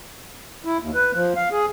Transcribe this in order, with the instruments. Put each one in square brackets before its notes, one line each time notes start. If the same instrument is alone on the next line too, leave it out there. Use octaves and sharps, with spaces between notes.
[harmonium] E4
D#2
B4
F3
F5
G#4